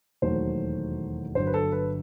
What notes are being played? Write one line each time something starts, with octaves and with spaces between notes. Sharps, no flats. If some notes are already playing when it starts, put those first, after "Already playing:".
E1 D#2 D#3 F#3 A3 C5
G1 G2 F#3 C5
B4
A4
B4